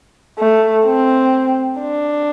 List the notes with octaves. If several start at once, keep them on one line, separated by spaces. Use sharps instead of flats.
A3
C4
D4